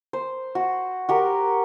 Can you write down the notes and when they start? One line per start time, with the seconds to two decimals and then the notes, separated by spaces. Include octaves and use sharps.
0.13 C5
0.55 F#4
1.09 F#4 G4 A#4